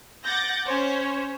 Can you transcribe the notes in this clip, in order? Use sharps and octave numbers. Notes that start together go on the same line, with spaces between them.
F#5 D6 G6 A6 A#6
C#4 C5 C#5